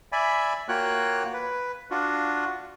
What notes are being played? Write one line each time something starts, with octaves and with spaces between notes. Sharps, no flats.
D5 E5 G#5 B5
A#3 F4 F#4 C#5 G5 F#6
B4
D4 F4 F#4